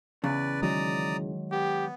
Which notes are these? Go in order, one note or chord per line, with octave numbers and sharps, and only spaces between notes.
E2 C#3 B4 D5
D#3 F#3 G#3 D5 A#5 D#6
B3 G4